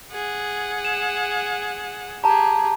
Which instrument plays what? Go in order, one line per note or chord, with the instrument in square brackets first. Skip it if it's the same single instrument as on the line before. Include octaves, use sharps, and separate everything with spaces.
[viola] G#4 F#5
[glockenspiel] E7
[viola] G4 G#4 [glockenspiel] A5 A#5